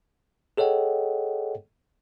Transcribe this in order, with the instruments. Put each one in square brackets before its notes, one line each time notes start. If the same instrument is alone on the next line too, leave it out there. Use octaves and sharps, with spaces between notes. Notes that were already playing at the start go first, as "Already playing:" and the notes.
[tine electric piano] G#4 A4 C#5 D#5 F#5 G5